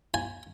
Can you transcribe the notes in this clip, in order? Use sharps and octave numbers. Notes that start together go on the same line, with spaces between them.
G#5